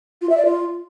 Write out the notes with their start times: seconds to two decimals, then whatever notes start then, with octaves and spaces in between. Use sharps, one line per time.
0.22 F4
0.29 E5
0.37 D5
0.45 F4